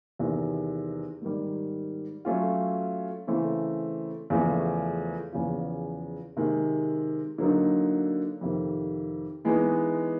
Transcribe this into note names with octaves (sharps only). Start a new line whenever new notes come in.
E2 C3 D#3
G#2 D#3 G3
F#3 A3 C#4 F4
C#3 E3 A3 C4
E2 C#3 F3 A3 C#4
E2 C#3 F3
C3 D#3 G#3
D3 F#3 A#3 D#4
F2 C3 D#3
E3 G#3 B3 D#4